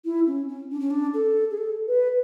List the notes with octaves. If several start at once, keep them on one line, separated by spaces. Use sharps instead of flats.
E4
C#4
C#4
D4
C#4
D4
A4
G#4
A4
B4